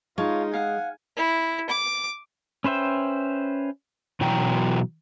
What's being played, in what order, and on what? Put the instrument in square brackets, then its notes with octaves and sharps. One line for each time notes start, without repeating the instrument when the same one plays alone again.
[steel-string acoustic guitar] G#3 [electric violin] D#4 F4 [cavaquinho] C#5 F5 A5
[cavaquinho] F5 F#5 [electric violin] G#5
[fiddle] E4
D6
[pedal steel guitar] C#4 B4 C5 E5 G5
[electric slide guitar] B2 E3 F#3 G5 A#5